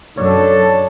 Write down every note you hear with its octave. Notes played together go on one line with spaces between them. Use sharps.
F#2 D4 A4 C#5